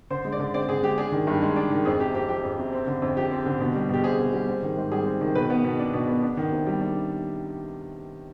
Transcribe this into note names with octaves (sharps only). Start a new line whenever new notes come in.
D3 C5
G#3
D5
D3
C4 D5
D3 G#4
G#3 G4
D4 G#4
D#3
G2
G#3
D4
D#3
F2 G#4
C3 G4
F2 G4
F3 G4
F2
C3
C4
D3
F2
F3 G4
C4
D3
B2
G3
B2 G4
C4 G#4
B2
G3
C4
D#3
G#2
G3 G#4
C4
D#3
B2 B4
B3
B2
D4
B2
B3
D4
D#3
C3
G3
D4